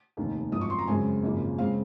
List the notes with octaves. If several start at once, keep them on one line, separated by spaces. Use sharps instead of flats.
F1 D#2 D#3
G#1 F#2 F3 D#6
C#6
C6
A#5
F#2 C#3 G#3 C4 G#5
G#1 F#2 C#3 F3 A#3
C#3 G#3 C4 F5